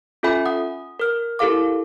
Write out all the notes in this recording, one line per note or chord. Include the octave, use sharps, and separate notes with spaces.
C#4 F4 A4 E5 G#5 B5
F#5 D#6
A#4 F6
E4 G4 A4 A#4 F5 D6